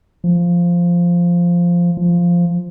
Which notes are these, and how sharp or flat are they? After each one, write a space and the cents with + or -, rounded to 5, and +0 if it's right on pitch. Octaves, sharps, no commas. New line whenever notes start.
F3 -5
F3 -5